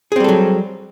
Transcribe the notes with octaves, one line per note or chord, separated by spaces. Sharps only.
F#3 G3 C4 G#4 A4